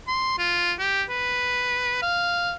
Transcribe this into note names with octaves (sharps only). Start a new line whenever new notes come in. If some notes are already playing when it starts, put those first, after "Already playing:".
C6
F4
G4
B4
F5